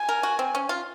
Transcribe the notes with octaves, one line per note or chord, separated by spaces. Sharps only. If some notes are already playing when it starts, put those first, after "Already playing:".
Already playing: G#5
A#4
F#4
C4
C#4
F4